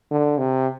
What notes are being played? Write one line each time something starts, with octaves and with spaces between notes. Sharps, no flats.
D3
C3